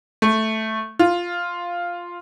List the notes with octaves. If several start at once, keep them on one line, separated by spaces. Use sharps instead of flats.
A3
F4